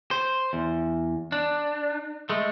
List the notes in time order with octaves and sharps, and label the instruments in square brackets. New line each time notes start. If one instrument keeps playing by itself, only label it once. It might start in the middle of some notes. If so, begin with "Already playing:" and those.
[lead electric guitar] C5
E2
D4
G#3 A3